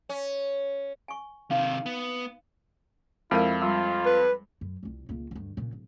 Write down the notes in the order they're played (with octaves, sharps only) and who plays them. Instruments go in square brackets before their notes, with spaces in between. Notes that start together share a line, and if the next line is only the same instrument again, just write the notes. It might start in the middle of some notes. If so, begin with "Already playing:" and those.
[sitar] C#4
[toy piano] G#5 C#6
[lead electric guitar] C3 D#3 [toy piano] D#4 F5
[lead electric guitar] B3
[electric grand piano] F2 [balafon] G#3 A#4 F5 [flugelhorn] E4
[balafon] G3 [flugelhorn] F4
[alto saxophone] B4
[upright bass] F#2
F1 C2
C#2 A#3
D2 G2
A#2 C#3
D1